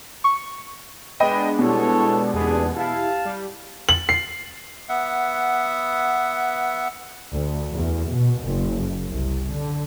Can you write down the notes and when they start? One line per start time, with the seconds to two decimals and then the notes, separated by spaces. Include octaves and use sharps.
0.24 C#6
1.20 G#3 B3 D4 D#5 G5 B5
1.59 B2 G3 E4 A4 C#5
2.33 F#1 E2 G#3 B3 D4 G#4
2.76 E4 G4 F5 A5
3.25 G3
3.89 F#7
4.09 C7
4.89 B3 E5 F#5
7.34 D2
7.72 E2
8.12 B2
8.44 F#1
9.10 C2
9.52 D3